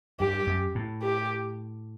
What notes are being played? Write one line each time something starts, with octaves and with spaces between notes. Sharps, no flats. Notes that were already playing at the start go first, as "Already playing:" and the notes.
G2 G4
F#2
A2
G4